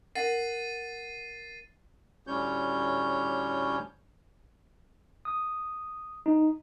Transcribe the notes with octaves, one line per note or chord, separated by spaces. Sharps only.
A#4 F#5 A6 C7 D#7
D2 A2 G3 C#4 C#5 G6
D#6
D#4